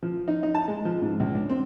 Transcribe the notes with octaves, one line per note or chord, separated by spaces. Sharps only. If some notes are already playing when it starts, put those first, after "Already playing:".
F3
D#4
D#4
A5
G#3
F3
G#2
C#2
D4
C4